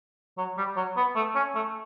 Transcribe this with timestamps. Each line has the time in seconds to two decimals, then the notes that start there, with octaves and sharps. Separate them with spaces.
0.38 F#3
0.58 G3
0.76 F#3
0.97 B3
1.16 A3
1.35 C#4
1.55 A3